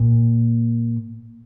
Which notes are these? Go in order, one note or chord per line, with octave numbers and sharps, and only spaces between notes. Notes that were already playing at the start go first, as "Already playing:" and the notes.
Already playing: A#2